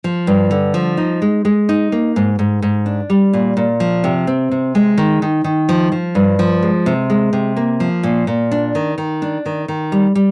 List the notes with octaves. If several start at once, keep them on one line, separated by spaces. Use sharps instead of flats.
F3
G2
D3
F3
D#4
G#3
G#3
D#4
A#3
G#2
G#2
G#2
D4
G3
A#2
A#2
F3
C3
C4
C3
G#3
D#3
D#3
D#3
F3
F3
G2
F3
G#3
C3
G#3
C3
A#3
F3
A#2
A#2
D4
D#3
D#3
D4
D#3
D#3
G3
G3